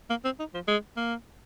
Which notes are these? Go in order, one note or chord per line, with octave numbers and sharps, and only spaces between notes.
A#3
C4
D#4
F3
G#3
A#3